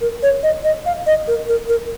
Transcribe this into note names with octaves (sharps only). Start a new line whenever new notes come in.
A#4
C#5
D#5
D#5
F5
D#5
A#4
A#4
A#4